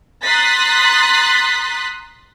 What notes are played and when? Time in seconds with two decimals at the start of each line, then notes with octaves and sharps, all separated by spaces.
0.25 A#5 C6 D#6 F#6 A6 B6